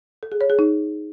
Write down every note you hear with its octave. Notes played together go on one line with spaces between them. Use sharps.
A4
G#4
C#5
G#4
D#4